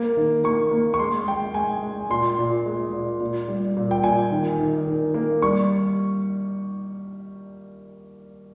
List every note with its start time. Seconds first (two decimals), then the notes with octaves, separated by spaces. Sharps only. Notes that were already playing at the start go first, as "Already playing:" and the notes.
Already playing: A#3
0.17 D#3
0.44 A#3 C#6
0.71 A#3
0.94 C#6
0.99 G#3 C6
1.27 G#3 G5
1.54 G#3 G#5
1.83 G#3
2.10 A#2 C6
2.39 A#2
2.66 G#3
2.93 A#2
3.21 A#2
3.48 G3
3.77 A#2
3.91 G5
4.04 A#2 G#5
4.31 D#3
4.59 D#3
4.87 D#3
5.14 A#3
5.42 G3 C#6